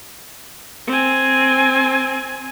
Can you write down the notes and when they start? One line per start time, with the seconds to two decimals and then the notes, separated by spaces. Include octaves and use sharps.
0.87 C4 G#5